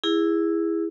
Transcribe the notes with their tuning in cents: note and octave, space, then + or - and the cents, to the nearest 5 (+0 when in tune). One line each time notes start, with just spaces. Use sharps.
E4 +0 G#4 -20